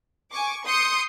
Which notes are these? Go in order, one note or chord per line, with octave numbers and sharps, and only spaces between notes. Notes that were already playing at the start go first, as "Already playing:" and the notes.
G#5 C#6 D6
C6 D#6 G6 C#7